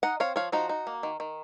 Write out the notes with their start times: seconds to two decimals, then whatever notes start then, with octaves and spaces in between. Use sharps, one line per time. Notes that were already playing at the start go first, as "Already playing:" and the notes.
0.03 D#4 D#5 F#5
0.20 C4 C#5 F5
0.36 F3 C#5 F5
0.52 F3 D#4 F#4
0.69 D#4
0.87 A#3
1.03 D#3
1.20 D#3